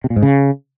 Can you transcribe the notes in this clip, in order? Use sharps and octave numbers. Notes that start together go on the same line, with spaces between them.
C3
A#2
G#2
C#3